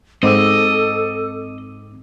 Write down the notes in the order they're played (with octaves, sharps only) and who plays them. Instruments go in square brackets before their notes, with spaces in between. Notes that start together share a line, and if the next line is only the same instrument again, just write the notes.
[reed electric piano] G#2 D6 E6 [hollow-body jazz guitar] C4 [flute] A4 [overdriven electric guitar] D#5